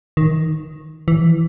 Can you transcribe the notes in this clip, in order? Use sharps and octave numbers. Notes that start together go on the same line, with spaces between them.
D#3
E3